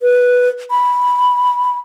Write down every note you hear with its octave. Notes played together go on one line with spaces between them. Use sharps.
B4
B5